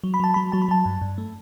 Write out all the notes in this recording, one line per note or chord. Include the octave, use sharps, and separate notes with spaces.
F#3
B5
F#3 A5
F#3 B5
F#3 A5
B5
F#3 A5
G2
G2
A3